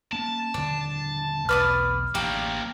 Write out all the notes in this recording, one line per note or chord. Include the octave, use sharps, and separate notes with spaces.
A#3 C#4 A5
D#1 D3 D4
B1 E2 B4 D5 D#6 F6
A1 D2 A#3 D4 G4